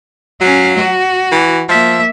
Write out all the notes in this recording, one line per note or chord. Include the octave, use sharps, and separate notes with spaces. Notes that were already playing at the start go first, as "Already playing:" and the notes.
F#3 C#4 F5
F#4
E3
F3 A#3 E5